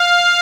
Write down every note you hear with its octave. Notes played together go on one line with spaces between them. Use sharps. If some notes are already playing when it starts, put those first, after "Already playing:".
Already playing: F5